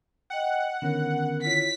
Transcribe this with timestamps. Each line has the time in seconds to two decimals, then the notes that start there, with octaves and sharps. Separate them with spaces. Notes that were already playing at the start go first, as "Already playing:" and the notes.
0.30 D#5 F#5 G5
0.82 D3 D#3 B3 C#4 A#4
1.44 E4 F4 C#5 B6